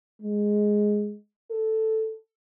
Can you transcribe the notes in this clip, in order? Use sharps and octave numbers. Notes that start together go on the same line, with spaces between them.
G#3
A4